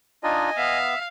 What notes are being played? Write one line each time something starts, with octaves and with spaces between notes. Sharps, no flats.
D4 D#4 F4 D#5 G#5
B3 E5 F5